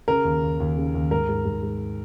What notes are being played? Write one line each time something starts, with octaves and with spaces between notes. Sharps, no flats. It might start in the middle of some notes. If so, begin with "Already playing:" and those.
C#3 A#4
D#2
D#2
D#2
C#3
D#2
G#2 A#4
G#2
G#2
G#2